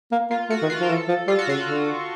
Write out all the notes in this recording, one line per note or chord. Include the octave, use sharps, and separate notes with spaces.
A#3
A#3 F4
A3 F#4
D#3
F4
F3 A#4
E3 A4
F3
G3 F4
F#4
C#3 F4
D3